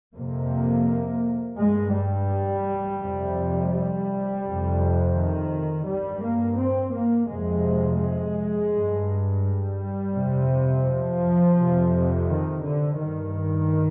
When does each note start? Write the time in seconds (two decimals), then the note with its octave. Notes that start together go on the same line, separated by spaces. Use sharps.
0.16 F2 C3 A#3
1.59 G2 G#3
1.95 G3
3.02 F2 C3
3.73 G3
4.45 F2 C3
5.15 D#3
5.87 G2 G3
6.23 A#3
6.59 C4
6.94 A#3
7.29 F2 C3 G#3
8.01 G#3
8.72 G2
9.43 G3
10.15 F2 C3
10.86 F3
11.57 F2 C3
12.28 D#3
12.64 D3
13.00 G2 D#3